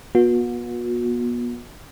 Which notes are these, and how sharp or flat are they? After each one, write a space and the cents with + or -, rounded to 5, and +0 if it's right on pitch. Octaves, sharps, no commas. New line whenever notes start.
B3 -35 F#4 -40